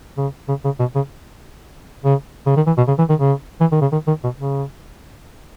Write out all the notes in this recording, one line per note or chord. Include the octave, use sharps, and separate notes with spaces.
C#3
C#3
C#3
B2
C#3
C#3
C#3
D#3
E3
B2
C#3
E3
D#3
C#3
E3
D#3
C#3
D#3
D#3
B2
C#3